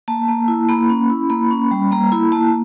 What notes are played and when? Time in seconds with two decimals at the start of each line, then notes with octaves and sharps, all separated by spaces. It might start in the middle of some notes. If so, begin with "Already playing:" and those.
0.08 A#3 A5
0.28 A#3
0.48 E4
0.69 A#3 B5
0.89 C#4
1.10 E4
1.30 A#3 B5
1.51 C#4
1.71 G3
1.91 A#3 A#5
2.12 E4 B5
2.32 A#3 A5